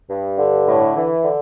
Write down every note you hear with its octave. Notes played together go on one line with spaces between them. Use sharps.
G2
D3
A2
E3
D3